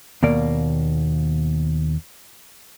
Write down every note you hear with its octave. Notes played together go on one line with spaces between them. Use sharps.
D#2 B2 A#3 D5